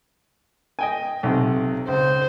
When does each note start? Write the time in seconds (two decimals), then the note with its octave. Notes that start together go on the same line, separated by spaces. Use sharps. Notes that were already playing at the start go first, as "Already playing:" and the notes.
0.79 D#5 G5 G#5
1.23 B1 C3
1.88 C#2 C5